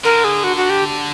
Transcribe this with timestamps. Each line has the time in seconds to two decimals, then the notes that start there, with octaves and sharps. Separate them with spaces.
0.04 D3 A#4
0.24 G#4
0.44 F#4
0.57 F#4
0.70 G4